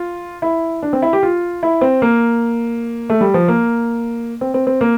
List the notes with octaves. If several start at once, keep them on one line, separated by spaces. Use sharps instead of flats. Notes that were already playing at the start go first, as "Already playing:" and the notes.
Already playing: F4
E4
D4
C4
E4
G4
F4
E4
C4
A#3
A3
G3
F3
A#3
C4
C4
C4
A#3